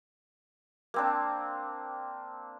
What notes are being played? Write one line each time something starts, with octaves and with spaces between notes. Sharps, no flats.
A#3 C4 D4